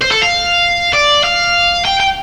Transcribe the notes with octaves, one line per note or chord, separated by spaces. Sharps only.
C5
A4
F5
D5
F5
G5
G5